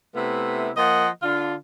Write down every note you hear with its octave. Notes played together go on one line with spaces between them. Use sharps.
C3 A3 B3 E4
F3 A#3 D#5 F#5
D3 D4 F4